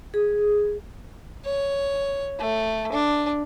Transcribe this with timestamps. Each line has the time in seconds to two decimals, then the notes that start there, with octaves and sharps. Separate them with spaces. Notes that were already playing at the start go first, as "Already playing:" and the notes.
0.14 G#4
1.45 C#5
2.39 A3
2.92 D4